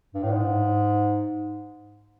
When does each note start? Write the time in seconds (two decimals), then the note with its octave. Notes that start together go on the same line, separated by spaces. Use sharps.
0.14 G2
0.23 A2
0.31 G#2